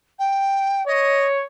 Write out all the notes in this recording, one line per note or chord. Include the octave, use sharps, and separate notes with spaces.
G5
C#5 D#5